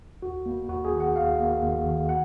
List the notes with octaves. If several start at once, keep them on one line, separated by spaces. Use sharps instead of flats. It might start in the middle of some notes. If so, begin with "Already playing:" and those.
D#2 F#4
A#3
D#2 F#4
G#4
D#3
F#5
D#2 F5
A#3
D#2
D#3
F#5